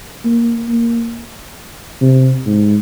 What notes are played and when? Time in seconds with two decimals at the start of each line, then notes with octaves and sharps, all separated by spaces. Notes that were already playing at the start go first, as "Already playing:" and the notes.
0.25 A#3
0.69 A#3
2.01 C3
2.46 G#2